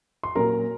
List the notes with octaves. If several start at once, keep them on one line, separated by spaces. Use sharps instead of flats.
C6
A#2 F#3 C#4 A#4 A#5